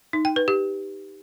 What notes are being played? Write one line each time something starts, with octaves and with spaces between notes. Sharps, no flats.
D#4
G5
B4
G4